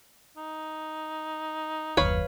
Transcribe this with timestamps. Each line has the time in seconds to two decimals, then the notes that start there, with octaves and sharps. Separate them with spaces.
0.37 D#4
1.97 F#1 D#2 B4 C#5 F5